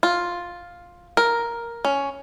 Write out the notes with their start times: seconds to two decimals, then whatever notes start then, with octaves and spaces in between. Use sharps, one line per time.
0.03 F4
1.17 A#4
1.85 C#4